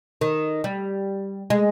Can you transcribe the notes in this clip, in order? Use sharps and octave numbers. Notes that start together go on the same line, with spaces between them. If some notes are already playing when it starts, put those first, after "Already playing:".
D#3
G3
G#3